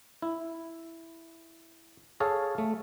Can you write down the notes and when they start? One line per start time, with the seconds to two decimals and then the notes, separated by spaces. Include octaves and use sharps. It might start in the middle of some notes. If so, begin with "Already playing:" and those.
0.22 E4
2.20 G#4 A4 C#5 F5
2.58 A3